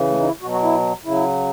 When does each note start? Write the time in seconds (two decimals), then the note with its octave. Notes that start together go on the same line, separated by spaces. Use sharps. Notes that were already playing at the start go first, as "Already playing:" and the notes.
Already playing: C#3 E3
0.10 A3
0.20 D#4
0.27 E4
0.42 B2 F#4
0.46 F#3
0.52 F#4
0.63 E4
1.05 C#3 F#3 E4